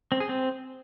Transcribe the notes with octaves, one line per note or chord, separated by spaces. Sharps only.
C4
G#4
C4